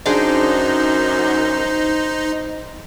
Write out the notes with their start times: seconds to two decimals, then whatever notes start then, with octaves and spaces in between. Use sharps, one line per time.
0.06 F#2 D4 D#4 G#4 C5 D6